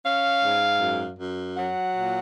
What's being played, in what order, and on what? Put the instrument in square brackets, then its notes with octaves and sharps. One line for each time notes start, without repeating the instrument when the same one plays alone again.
[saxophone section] C#4 F5
G#2
F#2
F#2
F#3 F#5
A#2